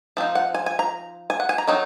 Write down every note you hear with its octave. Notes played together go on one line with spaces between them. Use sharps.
F3 C4 D#4
F#5
G#5
G#5
A#5
G#5
F#5
G#5
A#5
D#3 F#3 C4 D#4